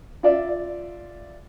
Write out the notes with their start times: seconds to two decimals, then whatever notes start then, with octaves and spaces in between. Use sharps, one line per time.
0.23 F4 D5 E5